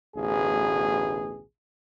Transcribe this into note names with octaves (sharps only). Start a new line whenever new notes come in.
A1 D2 B2 G#4